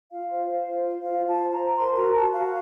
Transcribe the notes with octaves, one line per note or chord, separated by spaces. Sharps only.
F4 F5
C5
C5
F4
C5
F4 F5
F4
A5
C5
A#5
C5
A#4 C6
F#4 A#5
F#4 A5
F#4 F5